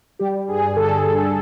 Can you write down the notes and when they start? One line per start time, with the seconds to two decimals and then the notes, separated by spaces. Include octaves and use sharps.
0.19 G3 G4
0.48 G2 G#4
0.76 D3 A4
1.04 D3